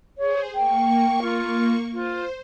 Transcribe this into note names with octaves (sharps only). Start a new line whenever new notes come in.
G#4 C5 C#5
A#3 G5 C#6
F4
F4 C5